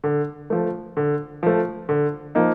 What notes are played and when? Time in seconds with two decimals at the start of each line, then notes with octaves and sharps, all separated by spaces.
0.04 D3
0.50 F3 A3
0.97 D3
1.43 F3 A3
1.89 D3
2.35 F3 A#3 D#4